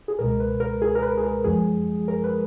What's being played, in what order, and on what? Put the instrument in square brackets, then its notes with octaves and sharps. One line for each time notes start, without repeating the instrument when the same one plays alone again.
[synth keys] G#4
C#2 B2 G#3 A#4
B4
A#4
G#4
A#4
B4
G#4
A#4
F#2 F3 G#3 G#4
A#4
B4